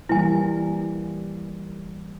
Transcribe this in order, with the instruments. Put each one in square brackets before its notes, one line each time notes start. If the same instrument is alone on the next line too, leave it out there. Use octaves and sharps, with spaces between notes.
[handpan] E3 G3 A#3 [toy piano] E4 G#5